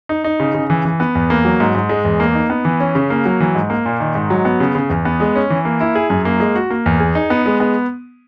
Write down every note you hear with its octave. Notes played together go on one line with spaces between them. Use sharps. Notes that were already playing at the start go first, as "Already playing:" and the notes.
D#4
D#4
C#3
C#3
E3
E3
B3
E2
A#3
F#3
G#2
G#2
G#3
E2
A#3
D#4
B3
E3
C#4
C#3
A#3
F#3
E3
G#2
A#3
A#2
D#3
G#2
F#3
B3
C#3
C#3
E2
B3
G#3
C#4
E3
A#3
E4
G#4
F#2
A#3
G#3
F#4
A#3
E2
G#4
D#4
B3
G#3
B3